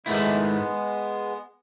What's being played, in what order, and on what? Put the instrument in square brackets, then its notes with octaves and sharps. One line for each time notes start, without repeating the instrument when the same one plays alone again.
[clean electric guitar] G#2 D#3 A3 E4 [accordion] G#3 B3